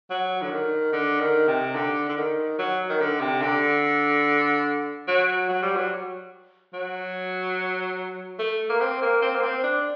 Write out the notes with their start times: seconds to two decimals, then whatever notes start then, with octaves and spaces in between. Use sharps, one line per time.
0.10 F#3
0.42 D3
0.51 D#3
0.92 D3
1.20 D#3
1.48 C3
1.75 D3
2.09 D3
2.17 D#3
2.59 F#3
2.89 D#3
3.01 D3
3.21 C3
3.42 D3
5.08 F#3
5.49 F#3
5.62 G3
5.76 F#3
6.73 F#3
8.39 A3
8.70 A#3
8.81 C4
9.02 A#3
9.22 C4
9.35 A#3
9.43 C4
9.64 D4